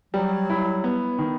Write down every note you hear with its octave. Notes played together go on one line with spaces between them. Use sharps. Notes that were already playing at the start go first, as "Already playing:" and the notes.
F#3 G3
E4
B3
D#3